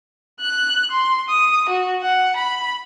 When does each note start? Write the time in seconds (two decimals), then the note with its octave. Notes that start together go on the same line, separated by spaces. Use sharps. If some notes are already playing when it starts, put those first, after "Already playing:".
0.41 F#6
0.91 C6
1.29 D#6
1.69 F#4
2.02 F#5
2.36 B5